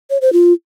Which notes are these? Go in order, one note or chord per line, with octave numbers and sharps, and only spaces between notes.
C#5
C5
F4